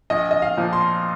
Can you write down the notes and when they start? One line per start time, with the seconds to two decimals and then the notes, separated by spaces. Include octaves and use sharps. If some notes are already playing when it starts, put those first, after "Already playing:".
0.10 A#1 D#5
0.31 D#5
0.42 F5
0.57 A#2 F3
0.73 C6